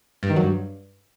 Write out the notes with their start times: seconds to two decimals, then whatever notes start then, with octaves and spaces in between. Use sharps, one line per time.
0.23 G2
0.30 D#3
0.36 F#3
0.43 G2